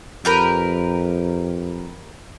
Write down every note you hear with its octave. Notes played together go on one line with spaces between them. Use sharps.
F2 G4 A#4 B4